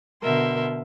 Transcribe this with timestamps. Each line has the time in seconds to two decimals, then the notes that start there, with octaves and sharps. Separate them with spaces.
0.23 B2 D3 A#4 E5 C6